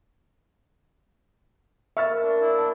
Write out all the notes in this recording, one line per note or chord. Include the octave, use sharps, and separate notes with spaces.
A#3 A#4 B4 E5 C#6 F6 A6
D4
D4 E4
D#3 E3 A5